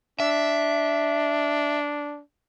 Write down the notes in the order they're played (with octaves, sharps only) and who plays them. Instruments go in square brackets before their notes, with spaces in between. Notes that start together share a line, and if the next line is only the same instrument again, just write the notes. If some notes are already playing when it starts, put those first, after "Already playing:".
[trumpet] D4 [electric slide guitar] E5